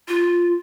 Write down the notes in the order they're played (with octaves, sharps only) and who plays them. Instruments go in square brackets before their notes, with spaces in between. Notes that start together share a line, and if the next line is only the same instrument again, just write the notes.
[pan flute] F4